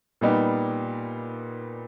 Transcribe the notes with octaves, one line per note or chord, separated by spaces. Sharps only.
A#2 G3 B3 D#4